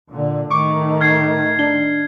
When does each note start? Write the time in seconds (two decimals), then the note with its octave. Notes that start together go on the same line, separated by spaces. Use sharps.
0.11 A#2 D3
0.50 A2 D#3 A3 C#6 D6
1.01 F6 G#6 C7
1.59 D4 G7